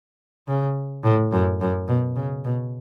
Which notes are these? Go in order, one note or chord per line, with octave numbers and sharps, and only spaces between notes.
C#3
A2
F#2
F#2
B2
C#3
B2